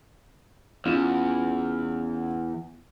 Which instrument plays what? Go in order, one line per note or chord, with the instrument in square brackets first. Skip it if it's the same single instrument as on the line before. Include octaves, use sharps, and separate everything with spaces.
[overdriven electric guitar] E2 [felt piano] C#4 F4